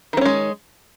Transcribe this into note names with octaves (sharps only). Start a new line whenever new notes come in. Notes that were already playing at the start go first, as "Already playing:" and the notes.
D#3 G#3 C4 C#4